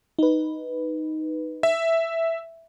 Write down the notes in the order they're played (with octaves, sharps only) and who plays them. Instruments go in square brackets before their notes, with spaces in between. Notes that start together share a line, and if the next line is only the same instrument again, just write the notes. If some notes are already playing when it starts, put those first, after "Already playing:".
[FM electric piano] D#4 B4
[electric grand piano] E5